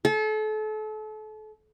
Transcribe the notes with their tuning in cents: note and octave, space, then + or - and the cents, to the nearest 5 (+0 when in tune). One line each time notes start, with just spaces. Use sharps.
A4 -35